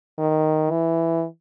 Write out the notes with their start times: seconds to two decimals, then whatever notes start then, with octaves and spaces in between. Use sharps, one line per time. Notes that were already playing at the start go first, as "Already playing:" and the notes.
0.19 D#3
0.70 E3